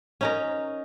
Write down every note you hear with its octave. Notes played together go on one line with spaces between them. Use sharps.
C#4 D#4 A#4